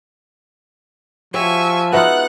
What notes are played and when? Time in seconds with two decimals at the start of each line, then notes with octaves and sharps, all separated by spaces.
1.34 F3 F#4 G4 C#5 E5 G#5 C#6
1.93 G#3 B3 D#4 F4 F#4 E5 F#5 F#6